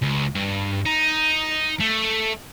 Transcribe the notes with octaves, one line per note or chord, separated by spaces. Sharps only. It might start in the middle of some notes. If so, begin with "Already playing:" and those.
C#2
G2
D#4
A3